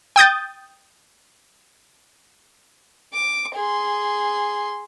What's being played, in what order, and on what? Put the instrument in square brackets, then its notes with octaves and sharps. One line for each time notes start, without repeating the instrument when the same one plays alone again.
[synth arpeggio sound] G5 D#6 G6 A6
[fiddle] D6
G#4 C6